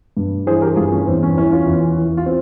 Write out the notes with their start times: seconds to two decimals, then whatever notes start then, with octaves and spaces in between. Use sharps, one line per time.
0.17 G2
0.47 E3 G#4 C5
0.62 G4 A#4
0.76 G2 F4 G#4
0.92 C#4
1.07 E2 C4
1.23 C#4
1.37 E3 C#4
1.51 C#4 F4
1.66 E2
1.97 E3
2.17 F4
2.26 C4